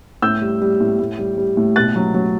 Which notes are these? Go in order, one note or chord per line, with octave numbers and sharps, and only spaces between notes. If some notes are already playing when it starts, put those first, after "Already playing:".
A2 E6 G6
G3
G3
A2
A2
G3
G3
A2
B2 F#6 A6
F#3
F#3